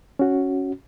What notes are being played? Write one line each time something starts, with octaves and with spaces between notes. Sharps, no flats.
C#4 F#4